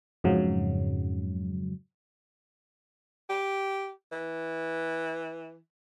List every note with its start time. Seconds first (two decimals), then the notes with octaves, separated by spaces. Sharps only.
0.24 F2 G#2 C#3 F#3
3.30 G4
4.12 E3